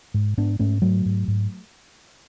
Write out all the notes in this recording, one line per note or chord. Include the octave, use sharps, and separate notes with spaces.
G#2
G#2 B3 D4
G#2 A3 C#4
G#2 F#3 A3
G#2
G#2